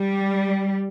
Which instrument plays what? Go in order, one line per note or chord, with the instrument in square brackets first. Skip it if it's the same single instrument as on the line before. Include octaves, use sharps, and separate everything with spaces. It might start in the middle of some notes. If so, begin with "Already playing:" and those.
Already playing: [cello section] G3